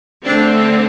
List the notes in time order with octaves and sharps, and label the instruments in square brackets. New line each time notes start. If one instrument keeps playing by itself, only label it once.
[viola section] D3 A3 C4 D4